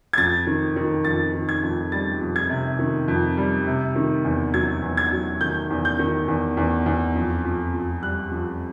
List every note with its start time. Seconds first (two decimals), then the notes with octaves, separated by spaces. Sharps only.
0.13 G#6
0.18 F2 A6
0.47 D#3
0.76 D#3
1.05 F2 A6
1.34 D#3
1.49 G#6
1.63 F2
1.92 G3 A6
2.21 F2
2.36 G#6
2.50 C3
2.79 D#3
3.08 F2
3.37 G3
3.67 C3
3.96 D#3
4.25 E2
4.54 F#3 G#6
4.82 E2
4.97 G#6
5.12 F#3
5.41 D#3 G6
5.70 E2
5.85 G6
5.99 D#3
6.28 E2
6.57 E2
6.86 E2
7.15 F2
7.45 F2
7.74 F2
8.02 G3 F#6
8.31 F2